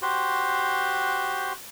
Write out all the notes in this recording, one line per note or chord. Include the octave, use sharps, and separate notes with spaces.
F#4 G4 C5 C6